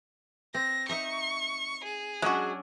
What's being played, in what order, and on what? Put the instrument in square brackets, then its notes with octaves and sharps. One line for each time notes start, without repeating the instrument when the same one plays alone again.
[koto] C4 [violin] A#6
[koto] D#4 E5 A#5 [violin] C#6
[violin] G#4
[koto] F#3 C#4 D4 [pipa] G#3 F#4